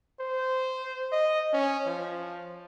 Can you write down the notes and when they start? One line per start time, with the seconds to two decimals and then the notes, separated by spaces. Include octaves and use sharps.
0.20 C5
1.12 D#5
1.53 C#4
1.87 F3